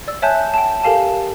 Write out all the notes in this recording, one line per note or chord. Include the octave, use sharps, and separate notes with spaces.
D5 E6
C#5 E5 G#5 A5 F#6 G6
G5 A5
G4 A4 A#4 F5 G#5 A5